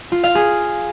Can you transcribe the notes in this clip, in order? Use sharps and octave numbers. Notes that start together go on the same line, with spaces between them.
F4
F5
G#4